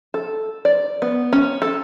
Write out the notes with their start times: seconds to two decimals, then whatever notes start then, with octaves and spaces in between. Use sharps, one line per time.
0.14 A4
0.65 D5
1.02 B3
1.33 C#4
1.62 A4